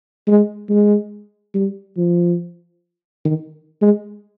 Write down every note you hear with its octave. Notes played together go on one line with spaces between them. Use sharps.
G#3
G#3
G3
F3
D#3
G#3